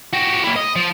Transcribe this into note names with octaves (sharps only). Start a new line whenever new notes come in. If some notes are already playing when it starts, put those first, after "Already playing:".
F#4 G4
A#3 E4
D#5
F3